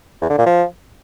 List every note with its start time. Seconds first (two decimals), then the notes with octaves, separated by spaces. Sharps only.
0.22 E2
0.30 D3
0.38 A#2
0.46 F3